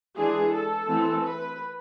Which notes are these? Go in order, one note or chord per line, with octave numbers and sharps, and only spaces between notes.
E3 G#3 D4 G#4
A4
E3 A3 C4
B4